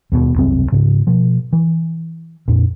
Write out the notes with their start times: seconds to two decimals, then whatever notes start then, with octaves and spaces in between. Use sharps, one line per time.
0.12 D#2 B2
0.35 E1 C2 F#2 C4
0.72 G#2 C#3
1.07 B2 F3
1.53 E3
2.48 F2 A#2